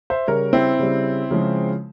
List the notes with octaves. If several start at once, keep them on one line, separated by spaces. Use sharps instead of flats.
C5 E5
C#3 G3 A#4 C#5
C4 E4
C#3 G3
C#3 F3 G#3